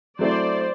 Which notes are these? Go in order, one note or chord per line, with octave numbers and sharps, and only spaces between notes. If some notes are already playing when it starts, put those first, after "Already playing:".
F#3 A3 C4 E4 C5 D5